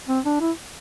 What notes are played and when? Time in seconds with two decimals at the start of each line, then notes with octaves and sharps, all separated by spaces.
0.09 C4
0.25 D4
0.40 E4